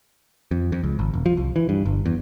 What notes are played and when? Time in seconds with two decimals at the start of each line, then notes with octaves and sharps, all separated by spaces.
0.51 F2
0.72 F2
0.84 C#2
0.99 G#1
1.13 E1
1.26 F3
1.37 C2
1.56 E3
1.69 G2
1.85 G1
2.06 E2